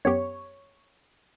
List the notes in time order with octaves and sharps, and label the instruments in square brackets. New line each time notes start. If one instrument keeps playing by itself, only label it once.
[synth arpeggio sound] F#2 B3 G4 [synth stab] C#5